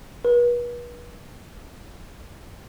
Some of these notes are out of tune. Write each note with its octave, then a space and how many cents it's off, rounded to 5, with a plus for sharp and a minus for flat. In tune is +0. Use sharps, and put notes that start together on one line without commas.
B4 -40